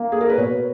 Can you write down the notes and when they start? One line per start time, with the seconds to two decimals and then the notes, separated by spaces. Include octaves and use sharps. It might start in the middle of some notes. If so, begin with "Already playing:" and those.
Already playing: A#3
0.12 G#4
0.21 A#4
0.30 B4
0.38 B2 C#5